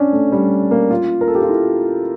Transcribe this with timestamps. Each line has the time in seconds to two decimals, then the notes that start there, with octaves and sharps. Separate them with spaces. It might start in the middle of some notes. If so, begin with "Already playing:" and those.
Already playing: C#4 D4
0.12 A3
0.32 G3
0.71 A#3
0.91 F4
1.21 A#4
1.28 A4
1.35 G4
1.42 F4
1.49 E4